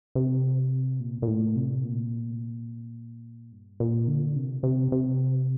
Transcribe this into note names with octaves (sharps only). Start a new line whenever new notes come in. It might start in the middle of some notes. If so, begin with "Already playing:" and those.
C3
A#2
A#2
A2
C3
A#2
G2
A#2
D3
C3
C3
C3